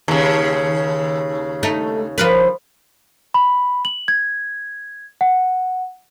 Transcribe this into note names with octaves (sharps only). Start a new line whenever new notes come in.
D#2 C#3
A3 D#4
F3 A#4 B4
B5
F#7
G#6
F#5